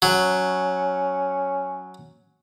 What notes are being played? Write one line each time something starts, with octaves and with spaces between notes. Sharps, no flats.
F#3 C#4